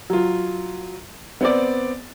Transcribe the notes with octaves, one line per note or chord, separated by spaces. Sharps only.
F#3 F4
B3 C4 D5